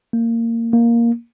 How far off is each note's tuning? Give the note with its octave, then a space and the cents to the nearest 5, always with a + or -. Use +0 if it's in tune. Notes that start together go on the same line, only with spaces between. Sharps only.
A#3 -20
A#3 +5